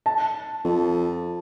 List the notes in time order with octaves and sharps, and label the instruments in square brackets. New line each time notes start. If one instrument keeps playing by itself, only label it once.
[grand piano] A5
[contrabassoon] F2